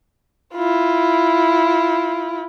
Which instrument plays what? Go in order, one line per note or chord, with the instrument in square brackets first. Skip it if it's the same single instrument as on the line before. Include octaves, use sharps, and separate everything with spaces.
[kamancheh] E4 F4